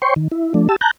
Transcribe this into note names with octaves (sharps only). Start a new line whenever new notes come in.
C5 C#5 G5 C6 C#6
D#3
E4
F3 A3 D4
G4 A5 E6
A5 A#5 F#6 G6